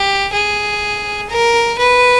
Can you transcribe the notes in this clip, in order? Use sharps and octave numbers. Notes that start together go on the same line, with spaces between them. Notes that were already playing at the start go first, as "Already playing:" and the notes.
Already playing: G4
G#4
A#4
B4